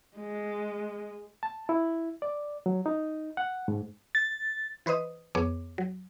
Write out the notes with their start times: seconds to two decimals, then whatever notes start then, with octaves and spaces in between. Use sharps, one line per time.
0.17 G#3
1.43 A5
1.69 E4
2.22 D5
2.66 F#3
2.86 D#4
3.37 F#5
3.68 G#2
4.15 A6
4.86 E3 B4 C5 D#5 D#6
5.35 F2 B3 G#4 C#5 D6
5.78 F#3